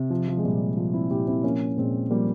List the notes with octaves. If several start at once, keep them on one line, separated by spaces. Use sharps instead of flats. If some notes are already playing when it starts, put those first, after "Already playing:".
Already playing: C3
F3
F3
G#3
A#2 G3
F3
C4 E4
A#2 E4 G4
C4 E4
F3 A#3 C#4
A#2 G#3 C4
F3 G3 A#3